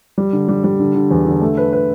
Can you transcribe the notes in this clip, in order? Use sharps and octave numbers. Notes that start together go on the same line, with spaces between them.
G3
D3
G3
G3
D3
D3
E2
D3
A3
B4
B4